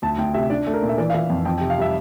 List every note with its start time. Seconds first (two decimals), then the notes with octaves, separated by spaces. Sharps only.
0.02 D2 A5
0.18 D2 G5
0.34 C3 E5
0.50 D4 D5
0.67 A3
0.74 A#4
0.83 A#2
0.89 E5
0.98 E3 D5
1.10 F5
1.13 E3 E5
1.30 F2
1.45 F2 G5
1.58 G5
1.61 C3
1.70 F5
1.78 G3 E5